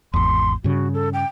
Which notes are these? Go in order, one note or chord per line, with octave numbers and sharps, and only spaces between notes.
G#1 E2 C6
G2 C#3 F#4
A4
G5